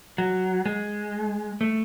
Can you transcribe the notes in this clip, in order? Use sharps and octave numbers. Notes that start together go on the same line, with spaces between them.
F#3
G#3
A3